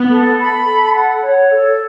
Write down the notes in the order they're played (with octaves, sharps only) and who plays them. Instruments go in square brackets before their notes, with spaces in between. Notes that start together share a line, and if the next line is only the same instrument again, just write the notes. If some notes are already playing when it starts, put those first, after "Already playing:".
Already playing: [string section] B3
[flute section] A4
B5
A4
F#5
C#5
A4